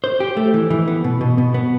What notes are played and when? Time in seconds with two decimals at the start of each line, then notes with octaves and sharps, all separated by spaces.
0.04 C5
0.20 G4
0.37 A3
0.54 E3
0.70 E3
0.88 B3
1.04 B2
1.21 B2
1.38 B2
1.54 B3